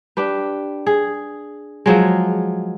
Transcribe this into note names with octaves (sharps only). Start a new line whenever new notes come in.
D4 G4 B4
G#4
F3 F#3 G#3